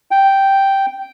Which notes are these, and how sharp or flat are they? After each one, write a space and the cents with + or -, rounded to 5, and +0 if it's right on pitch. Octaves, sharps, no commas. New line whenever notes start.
G5 -5